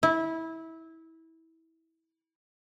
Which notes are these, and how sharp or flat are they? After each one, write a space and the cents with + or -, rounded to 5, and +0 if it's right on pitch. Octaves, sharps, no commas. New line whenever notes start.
E4 -20